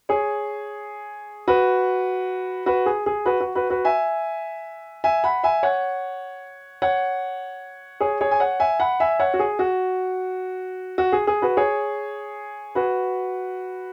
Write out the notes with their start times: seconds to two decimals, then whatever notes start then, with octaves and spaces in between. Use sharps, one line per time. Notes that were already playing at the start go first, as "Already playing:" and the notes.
0.09 G#4 C#5
1.48 F#4 B4
2.66 F#4 B4
2.86 G#4
3.06 G#4
3.26 F#4 B4
3.40 F#4
3.55 F#4 B4
3.70 F#4 B4
3.85 E5 G#5
5.04 E5 G#5
5.24 F#5 B5
5.43 E5 G#5
5.63 C#5 F#5
6.82 C#5 F#5
8.00 G#4 C#5
8.21 G#4 C#5
8.31 G#5
8.40 C#5 F#5
8.60 E5 G#5
8.80 F#5 B5
9.00 E5 G#5
9.20 C#5 F#5
9.34 F#4
9.39 G#4
9.59 F#4
10.98 F#4
11.12 G#4
11.27 G#4
11.42 F#4 B4
11.57 G#4 C#5
12.75 F#4 B4